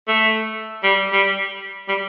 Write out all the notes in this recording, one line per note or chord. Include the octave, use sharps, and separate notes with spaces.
A3
G3
G3
G3